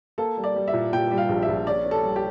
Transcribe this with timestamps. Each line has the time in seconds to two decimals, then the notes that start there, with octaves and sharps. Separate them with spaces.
0.18 A#3 A4
0.37 G3
0.44 D5
0.56 G3
0.68 E5
0.73 A#2
0.93 A#2 G5
1.11 G3
1.17 F5
1.29 A#1
1.42 E5
1.48 A#1
1.67 C#4 D5
1.84 C#4
1.91 A4
2.03 G3
2.16 G4